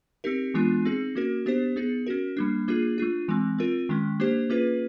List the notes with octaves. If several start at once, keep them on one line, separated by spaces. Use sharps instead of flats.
C4 D#4 G4 A#4
E3 G#3 B3 D4 F4
C4 D#4 G#4
A#3 C#4 F#4 A#4
B3 D4 G4 C5
B3 D#4 G#4
C#4 F#4 A#4
G3 A#3 D4
A#3 D4 F4 G#4
A3 D4 F4
E3 G#3 C4
C4 F4 A#4
D#3 G#3 C#4
A#3 D4 G4 C5
A#3 C#4 F4 G#4 B4